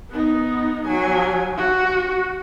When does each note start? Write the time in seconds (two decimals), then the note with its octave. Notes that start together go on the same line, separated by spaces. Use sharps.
0.11 B3 D#4
0.87 F#3 G#5
1.57 F#4